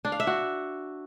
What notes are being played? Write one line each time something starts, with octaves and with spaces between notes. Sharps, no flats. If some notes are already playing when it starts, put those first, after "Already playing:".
D4
F5
E5
F#4